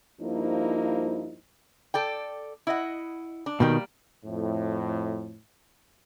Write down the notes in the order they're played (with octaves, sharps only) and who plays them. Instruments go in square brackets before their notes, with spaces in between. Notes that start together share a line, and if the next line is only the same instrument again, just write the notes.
[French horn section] G2 F3 A#3 D#4 E4 C5
[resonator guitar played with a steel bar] A4 D5 G5
E4 D#5 F#5
D4
[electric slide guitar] B2 D#3 [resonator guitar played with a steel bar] G3 A#3 G5
[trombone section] F2 A2